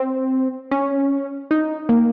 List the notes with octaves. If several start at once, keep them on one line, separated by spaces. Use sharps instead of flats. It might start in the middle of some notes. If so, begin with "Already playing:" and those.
Already playing: C4
C#4
D#4
A#3